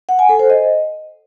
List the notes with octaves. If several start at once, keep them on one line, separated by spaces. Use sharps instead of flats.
F#5
G#5
A4
C5
D#5